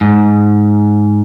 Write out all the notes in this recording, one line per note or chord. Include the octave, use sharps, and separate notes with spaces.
G#2